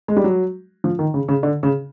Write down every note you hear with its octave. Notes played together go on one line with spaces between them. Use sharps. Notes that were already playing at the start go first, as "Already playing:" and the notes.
G#3
G3
F#3
F3
D#3
C#3
C#3
D3
C#3